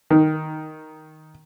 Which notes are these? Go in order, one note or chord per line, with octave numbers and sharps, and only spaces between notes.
D#3